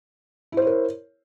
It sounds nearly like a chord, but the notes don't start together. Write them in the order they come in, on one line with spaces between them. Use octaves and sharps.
E4 C5 C#5 A#4